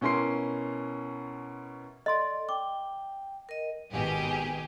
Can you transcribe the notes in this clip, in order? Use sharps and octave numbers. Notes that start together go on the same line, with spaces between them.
B2 C#4 E4 A#4 C6 C7
A4 D5 D#5 C6
G5 D6
A#4 D#5
G#1 B2 D#3 G4 G#4